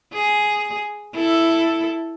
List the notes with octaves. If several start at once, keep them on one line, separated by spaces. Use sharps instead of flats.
G#4
E4 A4